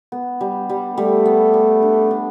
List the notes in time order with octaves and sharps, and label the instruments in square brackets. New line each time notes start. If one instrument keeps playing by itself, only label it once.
[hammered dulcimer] B3
G3
G3
[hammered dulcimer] G3 [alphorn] A3
[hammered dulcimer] B3
G3
D4
D4